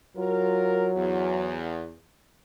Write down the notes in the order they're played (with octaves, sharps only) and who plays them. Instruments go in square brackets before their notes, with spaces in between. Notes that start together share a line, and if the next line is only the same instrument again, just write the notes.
[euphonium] F#3 [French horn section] F4 A#4
[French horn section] E2